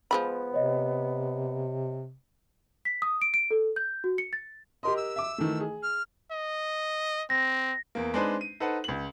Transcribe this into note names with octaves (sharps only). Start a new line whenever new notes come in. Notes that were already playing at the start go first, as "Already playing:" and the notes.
F3 G#3 B3 B5
C3 C#5 D#5
B6
D#6
D7
D7
A4
G6
F#4
C#7
A6
G4 A#4 D#5 C6
E6
E5 D6
D#3 E3 A3
G#4
F6
D#5
C4 A#6
E2 A#3
G#3 C4 D4 D#4 B4 C5
D#7
D#4 A4 B4 C5 F#5
C#2 F#7